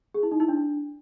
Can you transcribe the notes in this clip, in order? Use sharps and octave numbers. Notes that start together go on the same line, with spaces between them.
G#4
E4
D#4
E4
D4